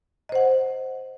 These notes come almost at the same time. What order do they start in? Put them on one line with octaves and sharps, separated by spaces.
D#5 C5 F#5